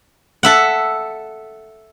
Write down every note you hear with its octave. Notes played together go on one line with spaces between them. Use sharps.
A4 E5 F#5